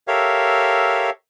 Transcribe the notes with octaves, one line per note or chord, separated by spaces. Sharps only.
G4 A4 A#4 C#5 E5 F5